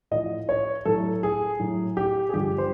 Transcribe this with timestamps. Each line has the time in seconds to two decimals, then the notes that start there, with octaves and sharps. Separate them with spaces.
0.11 A2 F3 D#5
0.49 C#5
0.85 A2 F#3 A4
1.23 G#4
1.59 A2 F#3
1.97 G4
2.29 G#4
2.34 G2 D3 F3 G4
2.58 C5